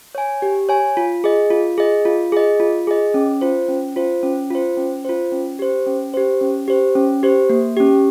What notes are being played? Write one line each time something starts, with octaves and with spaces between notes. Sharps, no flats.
C#5 G#5
G4
C#5 G#5
F4
G#4 D#5
F4
G#4 D#5
F4
G#4 D#5
F4
G#4 D#5
C#4
F4 C5
C#4
F4 C5
C#4
F4 C5
C#4
F4 C5
C#4
G4 C5
C#4
G4 C5
C#4
G4 C5
C#4
G4 C5
A#3
C#4 G4